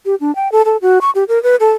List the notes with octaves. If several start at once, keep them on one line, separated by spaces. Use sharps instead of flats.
G4
D4
G5
A4
A4
F#4
C#6
G4
A#4
B4
A4